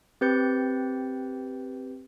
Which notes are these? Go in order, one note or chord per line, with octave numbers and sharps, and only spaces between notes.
C4 G4 B4 G6 A6 C#7